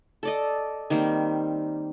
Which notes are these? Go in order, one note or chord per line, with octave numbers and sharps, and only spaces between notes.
A4 D5 D#5
D#3 G3 A#3 C4